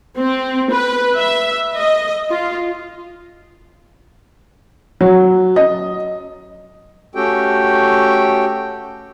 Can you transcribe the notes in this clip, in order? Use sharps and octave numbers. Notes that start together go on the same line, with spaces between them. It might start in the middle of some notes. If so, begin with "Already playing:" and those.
C4
B4
E5
D#5
F4
F#3
D#5
A3 C#4 F#4 G4 A4 G5